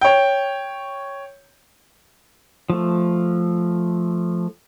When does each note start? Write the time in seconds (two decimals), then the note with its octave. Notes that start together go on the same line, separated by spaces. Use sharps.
0.01 C#5 G5
2.70 F3 A3